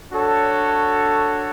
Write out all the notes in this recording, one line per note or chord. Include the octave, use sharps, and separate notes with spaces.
D4 F#4 A4 C#5